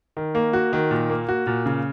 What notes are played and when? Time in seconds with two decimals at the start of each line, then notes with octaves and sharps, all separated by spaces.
0.17 D#3
0.35 A#3
0.53 F#4
0.73 D#3
0.91 A#2
1.10 A#3
1.29 F#4
1.47 A#2
1.66 C#3